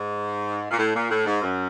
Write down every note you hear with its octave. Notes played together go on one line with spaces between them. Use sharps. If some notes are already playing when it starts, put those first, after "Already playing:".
Already playing: G#2
A#2
A2
A#2
A2
G#2
F#2